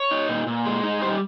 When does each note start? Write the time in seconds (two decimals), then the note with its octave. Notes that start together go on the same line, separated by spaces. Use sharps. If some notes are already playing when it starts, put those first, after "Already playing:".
Already playing: C#5
0.11 D#4
0.29 A#2
0.47 A#2
0.66 G#3
0.84 D#4
1.01 G3 C5